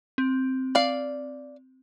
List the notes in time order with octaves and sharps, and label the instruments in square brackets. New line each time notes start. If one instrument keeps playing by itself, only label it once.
[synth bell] C4
[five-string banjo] D5 F5